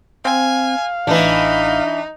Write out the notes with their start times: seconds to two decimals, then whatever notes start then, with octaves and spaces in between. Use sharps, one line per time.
0.25 C4 F5 G#5
1.07 A1 E3 D4 D#4